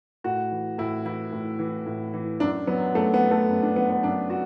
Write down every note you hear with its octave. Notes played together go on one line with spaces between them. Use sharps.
A2 F#4
E3
A2 E4
E3 E4
A2
E3
A2
E3
F#2 D4
F#3 B3
F#2 A3
B3
F#3
A3
F#2
D4
F#3 B3
B3
F#2 D4
F#4